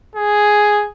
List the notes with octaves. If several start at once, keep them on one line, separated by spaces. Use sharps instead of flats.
G#4